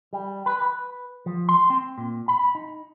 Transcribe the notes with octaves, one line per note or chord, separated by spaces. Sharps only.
G3
B4
B4
F3
C6
C4
A#2
B5
D#4